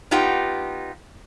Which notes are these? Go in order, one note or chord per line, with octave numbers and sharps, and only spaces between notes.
B3 D#4 F4 G4